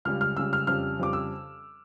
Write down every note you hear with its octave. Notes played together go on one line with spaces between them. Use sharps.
C#2 C#3 G3 F6
F6
C#2 C#3 G3 E6
F6
F2 C#3 G3 F6
F2 C#3 G3 D6
E6